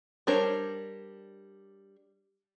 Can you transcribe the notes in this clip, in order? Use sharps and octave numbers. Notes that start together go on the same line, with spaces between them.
G3 D4 A#4 C5 C#5